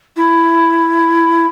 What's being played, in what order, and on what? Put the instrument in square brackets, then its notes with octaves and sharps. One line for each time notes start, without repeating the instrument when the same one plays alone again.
[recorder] E4